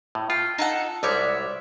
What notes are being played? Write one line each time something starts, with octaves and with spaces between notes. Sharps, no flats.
A2
F4 G5
D#4 A4 F#5
C2 G3 G#3 C#5 D5 E5